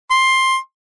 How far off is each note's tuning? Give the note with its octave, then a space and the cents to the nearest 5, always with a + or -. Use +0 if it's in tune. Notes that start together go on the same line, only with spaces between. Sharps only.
C6 +10